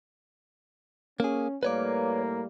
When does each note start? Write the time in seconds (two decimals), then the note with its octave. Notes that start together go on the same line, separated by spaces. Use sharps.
1.20 A#3 C#4 G#4
1.63 A2 G3 A#3 B4 C#5 D5